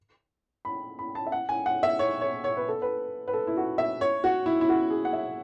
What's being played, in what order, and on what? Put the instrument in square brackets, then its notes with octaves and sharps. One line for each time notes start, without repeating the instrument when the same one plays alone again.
[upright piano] B5
B5
A5
E5
F#5
G#5
F#5
E5
C#5
C#5
C#5
B4
A4
B4
B4
A4
E4
F#4
E5
C#5
F#4
E4
E4
F#4
G#4
F#5
E5